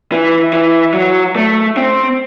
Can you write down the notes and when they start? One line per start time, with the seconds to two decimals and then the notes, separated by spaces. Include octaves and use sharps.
0.12 E3
0.53 E3
0.94 F#3
1.36 A3
1.77 C4